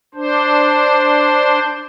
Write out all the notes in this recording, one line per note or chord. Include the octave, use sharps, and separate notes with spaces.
D4 C5